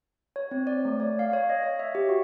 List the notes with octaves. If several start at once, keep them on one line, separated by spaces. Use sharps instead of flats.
C#5
C4
D5
A3
C#5
F5
C#5
D#5
C#5
E5
G4
F#4